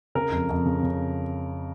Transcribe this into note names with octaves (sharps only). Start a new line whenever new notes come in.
C#3 A#4
F2
F2
C#3
C#3